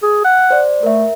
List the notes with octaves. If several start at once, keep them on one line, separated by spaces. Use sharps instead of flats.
G#4
F#5
C5 D5
A3 A#4 E5